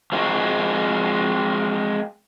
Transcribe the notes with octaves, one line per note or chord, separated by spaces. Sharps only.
F3 G#3 C4 E4 F#4